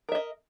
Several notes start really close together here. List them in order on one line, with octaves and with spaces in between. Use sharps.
A#4 E5 D#5